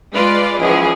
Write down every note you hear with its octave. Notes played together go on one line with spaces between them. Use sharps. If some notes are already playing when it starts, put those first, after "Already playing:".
G#3 F4 B4 D5
C#2 E3 F3 G#4